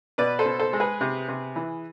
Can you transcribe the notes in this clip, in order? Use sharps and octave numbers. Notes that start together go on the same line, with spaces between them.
B2 B4 D5
A4 C5
B2
A4 C5
G#3
G#4 B4
C3
C3
E3